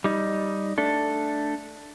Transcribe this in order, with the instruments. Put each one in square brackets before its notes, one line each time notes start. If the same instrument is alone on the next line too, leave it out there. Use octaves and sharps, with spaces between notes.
[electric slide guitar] G3 D#4
A3 D4 A4